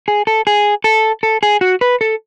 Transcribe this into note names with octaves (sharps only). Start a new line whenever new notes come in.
G#4
A4
G#4
A4
A4
G#4
F#4
B4
A4